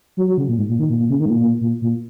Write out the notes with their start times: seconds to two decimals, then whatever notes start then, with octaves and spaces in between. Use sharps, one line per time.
0.17 F#3
0.28 F#3
0.38 C#3
0.48 A#2
0.58 G#2
0.69 A#2
0.79 D#3
0.89 A#2
0.99 A#2
1.10 C#3
1.20 D#3
1.26 G#2
1.30 A#2
1.40 A#2
1.61 A#2
1.82 A#2